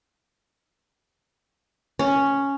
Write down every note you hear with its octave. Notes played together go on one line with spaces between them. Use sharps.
C#4